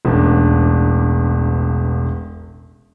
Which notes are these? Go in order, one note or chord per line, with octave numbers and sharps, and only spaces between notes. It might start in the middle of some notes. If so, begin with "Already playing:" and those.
E1 A1 D4